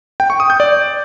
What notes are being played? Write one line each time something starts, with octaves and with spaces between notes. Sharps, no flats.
G5
C#6
D#6
G6
D5